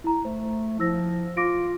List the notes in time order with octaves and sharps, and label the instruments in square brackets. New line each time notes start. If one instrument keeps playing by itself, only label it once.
[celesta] E4 A#5
[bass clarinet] A3 [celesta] C5
[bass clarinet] F3 [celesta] E4 E6 A#6
[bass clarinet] F4 [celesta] D6 A#6 D7